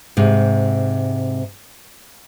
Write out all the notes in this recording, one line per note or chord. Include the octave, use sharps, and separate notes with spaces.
G#2 C3